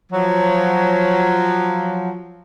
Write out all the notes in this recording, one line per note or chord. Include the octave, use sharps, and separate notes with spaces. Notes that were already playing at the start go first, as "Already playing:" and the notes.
F3 F#3